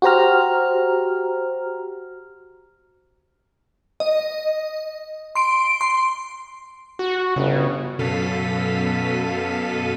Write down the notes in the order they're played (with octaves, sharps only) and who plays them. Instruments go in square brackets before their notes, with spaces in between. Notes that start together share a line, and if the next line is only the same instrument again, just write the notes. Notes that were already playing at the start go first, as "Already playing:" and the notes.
[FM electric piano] F#4 G4 C5 A#5 F6
[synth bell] D#5
C6 D7
C6
[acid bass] F#4
[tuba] G1 [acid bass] C#3
[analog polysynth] F#2 B2 A4 F5 B6 D#7